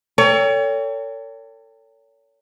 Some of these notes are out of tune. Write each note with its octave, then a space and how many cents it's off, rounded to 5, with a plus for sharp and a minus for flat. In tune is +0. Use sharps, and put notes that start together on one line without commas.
A4 +40 C#5 +35 G5 +25